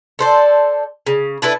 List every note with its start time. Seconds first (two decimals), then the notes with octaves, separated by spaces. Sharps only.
0.19 A4 C5 D5
1.07 C#3
1.42 D4 E4 A4 B4